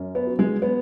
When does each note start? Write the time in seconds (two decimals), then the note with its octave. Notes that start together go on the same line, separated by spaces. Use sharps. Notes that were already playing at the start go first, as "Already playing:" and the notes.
Already playing: F#2
0.15 B3
0.27 F#3
0.39 G#3
0.62 B3